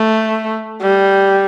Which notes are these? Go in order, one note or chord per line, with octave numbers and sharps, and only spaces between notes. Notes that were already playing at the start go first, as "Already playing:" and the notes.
Already playing: A3
G3